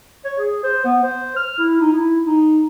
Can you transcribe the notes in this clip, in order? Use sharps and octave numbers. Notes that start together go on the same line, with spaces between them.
C#5
G#4
C5
B3
C5
F6
E4
D#4
E4
D#4